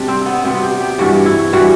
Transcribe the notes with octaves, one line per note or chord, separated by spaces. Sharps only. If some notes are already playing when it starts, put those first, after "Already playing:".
Already playing: C3 G3 D4
C4
B3
C3 G3 B3
G4
G4
G2 E3 G3 F#4
E4
E3 G3 F#4